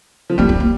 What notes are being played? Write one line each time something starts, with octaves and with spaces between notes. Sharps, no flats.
F3
G3 A#3
C4
A#3